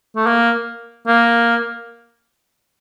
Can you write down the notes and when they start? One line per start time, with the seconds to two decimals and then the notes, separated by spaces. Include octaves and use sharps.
0.16 A3
0.27 A#3
1.07 A#3